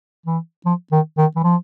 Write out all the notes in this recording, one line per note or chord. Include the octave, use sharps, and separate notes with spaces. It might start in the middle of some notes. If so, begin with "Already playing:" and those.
E3
F3
D#3
D#3
E3
F3